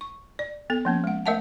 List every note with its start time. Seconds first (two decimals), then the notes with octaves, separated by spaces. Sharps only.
0.01 C#6
0.39 D5
0.70 B3 A4
0.85 F3 A#3 C#4
1.04 G#3 F#5
1.26 A3 A#4 D#5 E5 F#5 A5